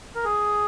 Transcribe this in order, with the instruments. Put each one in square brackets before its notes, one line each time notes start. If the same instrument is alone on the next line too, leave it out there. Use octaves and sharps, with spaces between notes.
[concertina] A#4
G#4